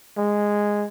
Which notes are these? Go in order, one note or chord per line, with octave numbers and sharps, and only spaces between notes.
G#3